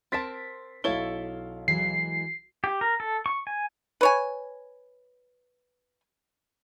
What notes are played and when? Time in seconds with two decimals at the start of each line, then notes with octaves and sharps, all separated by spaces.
0.12 C4 A#4 A5 C6 A6 B6
0.84 B1 E4 A4 C#5 F5 G7
1.68 E3 F#3 G#3 C7
2.64 G4
2.81 A#4
3.00 A4
3.26 C#6
3.47 G#5
4.01 B4 C#5 G#5